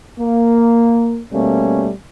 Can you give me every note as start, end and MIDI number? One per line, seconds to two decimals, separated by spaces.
0.17 1.20 58
1.31 1.89 47
1.31 1.89 55
1.31 1.89 57
1.31 1.89 58
1.31 1.89 61